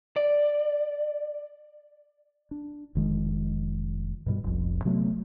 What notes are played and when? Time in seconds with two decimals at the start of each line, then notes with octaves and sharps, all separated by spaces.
0.16 D5
2.51 D4
2.95 F1 D#3 G#3
4.26 G2 B2 G3
4.44 F1 B1 F2
4.85 C3 F#3 A3 B3